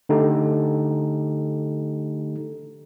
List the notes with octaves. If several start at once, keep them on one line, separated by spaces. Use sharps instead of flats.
D3 A3 D#4 G4 A4